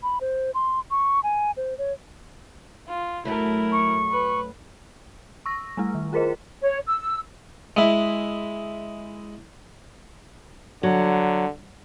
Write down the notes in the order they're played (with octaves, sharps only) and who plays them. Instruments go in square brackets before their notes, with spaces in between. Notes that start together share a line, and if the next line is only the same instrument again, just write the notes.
[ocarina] B5
C5
C6
C#6
G#5
C5
C#5
[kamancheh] F4
[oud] F#2 F#3 A3 [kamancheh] E4 A#4
[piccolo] C#6
[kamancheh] B4
[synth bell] C#6 E6 A#6
G3 A3 E4
D#3
F4 G#4 A#4 C5 D#5
[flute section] C#5
E6
[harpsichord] G#3 E4
[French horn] D3 [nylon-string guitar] F#3